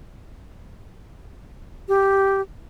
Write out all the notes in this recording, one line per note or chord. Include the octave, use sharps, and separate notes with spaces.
G4